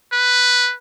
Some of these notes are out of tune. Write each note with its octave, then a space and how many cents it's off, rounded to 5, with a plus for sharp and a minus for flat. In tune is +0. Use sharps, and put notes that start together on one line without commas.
B4 +0